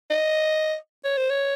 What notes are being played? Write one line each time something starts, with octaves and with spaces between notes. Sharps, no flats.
D#5
C#5
C5
C#5